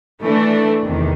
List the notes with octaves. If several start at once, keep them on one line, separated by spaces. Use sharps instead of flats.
E3 A3 D4
E2 C3 D#3